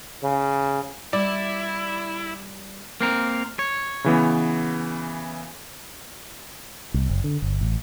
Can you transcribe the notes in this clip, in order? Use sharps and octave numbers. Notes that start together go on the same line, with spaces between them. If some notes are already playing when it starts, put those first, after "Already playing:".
C#3
G3 E4 D5
A#3 C4 A#4
C#5
C#3 E3 B3
C2
F#1
D3
G1
A1